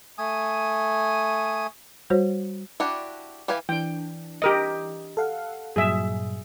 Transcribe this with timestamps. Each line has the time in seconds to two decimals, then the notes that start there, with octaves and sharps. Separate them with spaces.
0.18 A3 G#5 D#6
2.10 G3 F#4 C5 C#5
2.80 D4 E4 F#4 G4
3.48 E3 G4 B4 F5 G#5
3.69 E3 D4 G5
4.42 G4 A#4 D#5
5.17 A4 F5 F#5
5.76 G2 A#2 F#3 G#4 E5